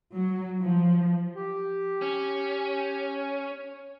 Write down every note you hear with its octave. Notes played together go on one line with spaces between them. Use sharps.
F#3
F3
G4
C#4